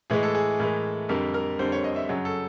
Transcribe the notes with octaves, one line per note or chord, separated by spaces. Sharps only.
A2 E3 G#3 G#4
A4
G#4
A2 E3 G#3 A#4
F2 D3 G3 A#4
A#4
F2 D3 G3 C5
C#5
D#5
E5
F#2 C#3 F#3
A4